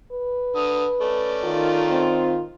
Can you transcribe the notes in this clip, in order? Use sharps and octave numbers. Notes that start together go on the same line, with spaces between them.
B4
D3 D#6
A3 C#4 D5
D#3 F4
C4